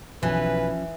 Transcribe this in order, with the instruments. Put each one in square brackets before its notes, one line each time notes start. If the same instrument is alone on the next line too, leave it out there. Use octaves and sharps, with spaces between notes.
[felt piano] B1 G#5 [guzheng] E3 [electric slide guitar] F3 C#4 [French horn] B4